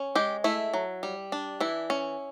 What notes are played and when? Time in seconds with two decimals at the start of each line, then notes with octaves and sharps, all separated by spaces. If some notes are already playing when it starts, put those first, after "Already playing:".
Already playing: C#4
0.15 G#3 G4
0.44 A3 E4
0.74 F#3
1.03 G3
1.32 D4
1.60 E3 E4
1.90 C#4